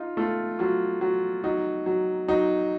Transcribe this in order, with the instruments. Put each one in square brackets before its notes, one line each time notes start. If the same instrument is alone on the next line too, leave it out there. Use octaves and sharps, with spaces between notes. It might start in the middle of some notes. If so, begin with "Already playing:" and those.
Already playing: [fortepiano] D#4 [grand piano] F4
[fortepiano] A3 [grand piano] F4
[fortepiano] F#3 [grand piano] F4
[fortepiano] F#3
[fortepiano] F#3 [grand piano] D#4
[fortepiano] F#3
[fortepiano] F#3 [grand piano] D#4